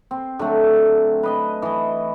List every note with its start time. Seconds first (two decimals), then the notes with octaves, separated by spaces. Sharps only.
0.11 C4
0.39 D3 F#3 A3
1.23 B4 D#5 A5
1.62 E3 D#5